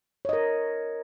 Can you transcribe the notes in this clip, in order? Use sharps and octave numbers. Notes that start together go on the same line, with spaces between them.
A#4 C#5 D#5